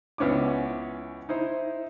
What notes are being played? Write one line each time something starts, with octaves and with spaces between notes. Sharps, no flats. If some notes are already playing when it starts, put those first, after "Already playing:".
C#2 B3 C#4 E4 D6
D#4 E4 C5